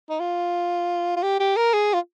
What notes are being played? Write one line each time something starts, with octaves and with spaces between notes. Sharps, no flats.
D#4
F4
F4
G4
G4
A#4
G#4
F4